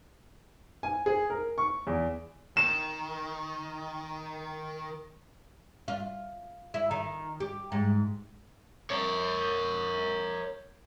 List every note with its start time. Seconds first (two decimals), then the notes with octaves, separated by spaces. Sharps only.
0.83 G#5
1.06 G#4
1.30 A#4
1.58 C#6
1.87 E2
2.57 D#3 E7
5.88 F4
6.74 E4
6.91 D#3
7.40 G4
7.72 G#2
8.90 A#4 C#5